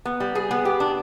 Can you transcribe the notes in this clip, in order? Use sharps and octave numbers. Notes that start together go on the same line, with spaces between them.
B3
G3
G#4
B3
G4
D4